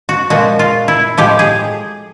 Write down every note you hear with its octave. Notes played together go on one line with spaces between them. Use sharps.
F#4
A#2 F3 G#3 F#4
F4
E4
A2 F3 G#3 G4
G#4